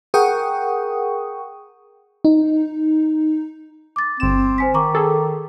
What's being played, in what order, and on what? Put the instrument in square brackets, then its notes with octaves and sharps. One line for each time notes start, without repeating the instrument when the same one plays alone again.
[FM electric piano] G#4 A#4 F#5 G5 C#6 D#6
D#4
[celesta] D6 A6
[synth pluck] G1 E7 [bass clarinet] C4
[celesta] C5 G#5 B6
[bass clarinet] D#3 [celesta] A#5 C#6 D6
[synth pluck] G#4 A4